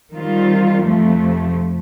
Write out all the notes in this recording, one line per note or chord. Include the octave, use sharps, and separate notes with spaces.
D#3 G3 C4 F4
F2 C3 F3 A3